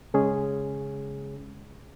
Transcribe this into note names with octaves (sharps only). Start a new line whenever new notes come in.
C#3 G#3 C#4 G#4